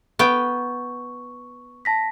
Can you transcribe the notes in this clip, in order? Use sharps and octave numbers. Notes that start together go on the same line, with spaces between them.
B3 G5 C#6
A5 A#6 B6